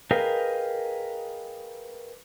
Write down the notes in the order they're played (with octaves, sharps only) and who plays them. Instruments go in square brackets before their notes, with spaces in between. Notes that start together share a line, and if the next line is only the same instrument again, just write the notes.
[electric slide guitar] G#4 A#4 B4 D#5 F5 G5